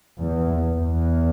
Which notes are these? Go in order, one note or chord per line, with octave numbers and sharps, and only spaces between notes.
E2
E2